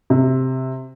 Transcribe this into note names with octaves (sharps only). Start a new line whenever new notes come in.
C3